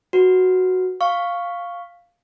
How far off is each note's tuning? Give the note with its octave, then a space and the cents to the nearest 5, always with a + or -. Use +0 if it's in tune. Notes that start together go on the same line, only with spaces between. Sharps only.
F#4 +0 B4 +0
F5 +0 C#6 +0